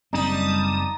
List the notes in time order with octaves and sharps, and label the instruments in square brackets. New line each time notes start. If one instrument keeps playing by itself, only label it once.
[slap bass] F#1 C4 [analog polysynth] G3 A5 D#6 [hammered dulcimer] D#4